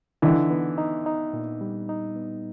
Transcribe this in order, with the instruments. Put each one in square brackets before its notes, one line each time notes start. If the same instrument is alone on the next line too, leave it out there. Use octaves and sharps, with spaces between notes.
[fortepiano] D3 E3 [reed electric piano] D#4
[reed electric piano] B3
D#4
D#4
A#2
G3
D#4
B3